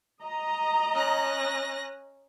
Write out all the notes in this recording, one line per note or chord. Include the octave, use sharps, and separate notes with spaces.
D#5 A#5
C#4 F#6 A#6